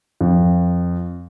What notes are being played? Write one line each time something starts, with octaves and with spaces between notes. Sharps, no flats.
F2